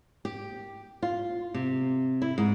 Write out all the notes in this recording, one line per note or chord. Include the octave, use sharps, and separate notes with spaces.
G4
F4
C3
E4
G#2